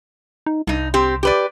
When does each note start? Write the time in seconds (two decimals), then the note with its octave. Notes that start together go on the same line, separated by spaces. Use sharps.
0.46 D#4
0.67 C2 G2 D#4
0.94 C4 G4
1.23 G4 B4 D5